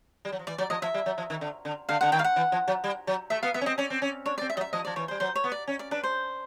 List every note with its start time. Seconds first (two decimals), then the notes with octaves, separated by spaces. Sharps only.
0.25 G3
0.32 F#3
0.39 F3
0.47 E3 D5
0.58 F#3 D5
0.70 F3 D#5
0.82 F3 E5
0.94 G3
1.06 F#3
1.18 F3
1.30 D#3
1.41 D3
1.65 D3
1.89 D3 F5
2.01 D3 F#5
2.12 D#3 G5
2.19 F5
2.24 F#5
2.36 E3
2.52 F3
2.68 F#3
2.84 G3
3.07 F#3
3.30 A3 E5
3.43 B3 F5
3.54 B3 E5
3.61 C#4
3.66 C4 D#5
3.78 C#4 D5
3.90 C4
4.02 C#4
4.26 D4 C#5
4.38 D5
4.41 C4
4.50 E5
4.57 F#3 D#5
4.61 E5
4.73 F3 D#5
4.85 F3 D5
4.96 E3 C#5
5.08 C5
5.11 G3
5.20 F#3 C5
5.36 C#5
5.44 B3
5.52 D5
5.68 C#4
5.79 D5
5.91 D4 B4
6.04 C5